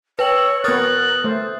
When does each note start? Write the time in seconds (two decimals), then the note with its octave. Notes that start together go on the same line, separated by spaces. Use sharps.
0.19 B4 C#5 G5 E6 F#7
0.64 B3 A#4 C#5 D#6 F6 F#6 A6
1.24 A3 C5